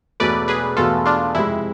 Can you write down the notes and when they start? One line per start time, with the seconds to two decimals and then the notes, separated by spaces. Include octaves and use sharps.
0.20 E1 E2 B2 A3 B4 D5
0.48 G#4 B4
0.77 E1 E2 B2 A3 F4 A4
1.06 D4 F4
1.35 F2 C3 G#3 E4